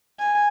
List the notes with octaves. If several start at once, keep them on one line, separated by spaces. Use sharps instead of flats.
G#5